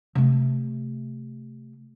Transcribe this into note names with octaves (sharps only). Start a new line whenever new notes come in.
C3 A3